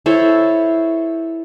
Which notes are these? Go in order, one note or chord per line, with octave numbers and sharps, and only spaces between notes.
E4 A4 C5 C#5